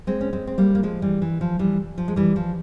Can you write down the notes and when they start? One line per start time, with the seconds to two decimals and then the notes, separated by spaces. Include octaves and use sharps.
0.07 G#3 C4
0.21 C#4
0.33 G#3 C4
0.47 C4
0.58 G3 A#3
0.75 A#3
0.83 F3 G#3
1.02 E3 G3
1.22 E3
1.41 F3
1.59 E3 G3
1.98 F3
2.08 G#3
2.16 E3 G3
2.36 F3